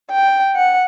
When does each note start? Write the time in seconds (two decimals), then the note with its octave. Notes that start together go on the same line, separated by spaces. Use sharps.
0.11 G5
0.56 F#5